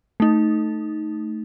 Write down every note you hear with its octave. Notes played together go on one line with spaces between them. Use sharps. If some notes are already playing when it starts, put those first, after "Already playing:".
A3 D#4